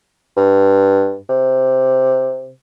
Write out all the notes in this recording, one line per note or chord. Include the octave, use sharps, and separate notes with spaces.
G2
C3